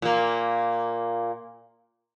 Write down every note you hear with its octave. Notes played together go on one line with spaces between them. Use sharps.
A#2 A#3